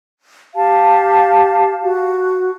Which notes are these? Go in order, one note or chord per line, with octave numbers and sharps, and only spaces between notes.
G4 F5 A5
F#4